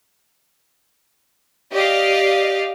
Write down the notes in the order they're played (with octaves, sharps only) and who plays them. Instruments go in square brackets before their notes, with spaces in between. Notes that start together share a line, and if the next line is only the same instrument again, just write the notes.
[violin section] G4 D5 D#5 F5